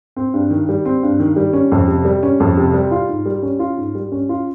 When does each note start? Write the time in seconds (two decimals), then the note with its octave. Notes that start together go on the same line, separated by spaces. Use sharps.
0.16 C4
0.34 G2
0.50 D#3
0.69 G3
0.85 C4
1.03 G2
1.20 D#3
1.36 G3
1.53 C#4
1.72 F2
1.88 C3
2.05 G3
2.23 C#4
2.40 F2
2.57 C3
2.73 G3
2.91 F4
3.09 G#2
3.26 G3
3.43 C#4
3.59 F4
3.78 G#2
3.95 G3
4.12 C#4
4.29 F4